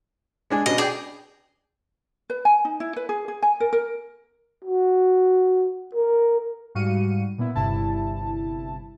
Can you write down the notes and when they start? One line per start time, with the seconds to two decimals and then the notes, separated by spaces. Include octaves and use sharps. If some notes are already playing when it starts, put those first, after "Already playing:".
0.50 G#3 D4 G#5
0.66 B2 C#4 D4 D#5
0.78 G#4 D5 G5
2.30 B4
2.45 G#5
2.65 D#4
2.80 E4
2.96 B4
3.09 G#4
3.28 G#4
3.42 G#5
3.60 A#4
3.73 A#4
4.65 F#4
5.95 A#4
6.75 G#2 G3 F#4 F5 C#7 D#7
7.38 A#2 B3 E4
7.55 G1 G2 C3 E4 A5